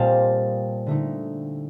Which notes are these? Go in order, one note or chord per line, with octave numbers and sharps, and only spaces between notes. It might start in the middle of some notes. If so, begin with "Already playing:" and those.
Already playing: A#2 G3 C4 D#5 F5 G5 A5
D3 A3 D#4